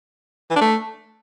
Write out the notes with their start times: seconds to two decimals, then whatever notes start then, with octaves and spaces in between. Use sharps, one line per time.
0.50 E3
0.56 D4
0.61 A3